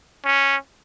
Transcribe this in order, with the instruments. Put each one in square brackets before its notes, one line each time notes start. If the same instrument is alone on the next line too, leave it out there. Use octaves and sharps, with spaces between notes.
[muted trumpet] C#4